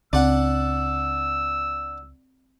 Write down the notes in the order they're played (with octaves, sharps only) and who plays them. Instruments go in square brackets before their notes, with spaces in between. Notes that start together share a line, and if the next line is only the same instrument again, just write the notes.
[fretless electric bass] C#2 [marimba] C4 [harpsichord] D4 F#5 [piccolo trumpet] E6